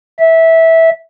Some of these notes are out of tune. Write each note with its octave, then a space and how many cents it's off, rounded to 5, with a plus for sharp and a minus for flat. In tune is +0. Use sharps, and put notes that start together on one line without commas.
E5 -15